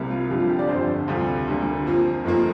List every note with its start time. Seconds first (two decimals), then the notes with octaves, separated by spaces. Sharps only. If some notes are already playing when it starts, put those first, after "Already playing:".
Already playing: C2 C3 G3 A#3
0.10 F4
0.30 F2 D3 G3 G4
0.40 F4
0.49 G4
0.59 D5
0.68 G1 F2 D3 C5
1.08 D2 C3 G3 F4
1.48 D2 D3 G3 A#3
1.86 F2 F3 A#3
2.24 F1 F2 F3 A#3